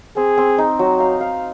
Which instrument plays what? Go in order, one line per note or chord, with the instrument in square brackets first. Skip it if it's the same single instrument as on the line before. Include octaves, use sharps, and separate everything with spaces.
[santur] C4 [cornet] G#4
[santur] C4
D#4
F#3
F5
F5